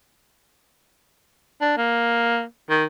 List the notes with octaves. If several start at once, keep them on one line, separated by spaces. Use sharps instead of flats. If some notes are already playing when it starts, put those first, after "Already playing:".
D4
A#3
D#3